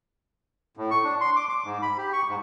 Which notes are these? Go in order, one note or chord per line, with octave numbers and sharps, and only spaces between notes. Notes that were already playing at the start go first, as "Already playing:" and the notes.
A2
C#6
D4
C6
D6
D6
G#2
B5
G4
C#6
G#2